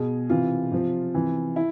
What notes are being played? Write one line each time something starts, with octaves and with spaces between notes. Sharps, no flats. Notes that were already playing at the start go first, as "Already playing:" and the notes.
Already playing: B2 G#4
C3 E3 F4
C3 F3
C3 E3
E4